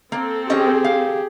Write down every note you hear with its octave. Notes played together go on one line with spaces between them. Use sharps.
A#3 C4 A4
C#4 G4 G#4 D#5 G5
F5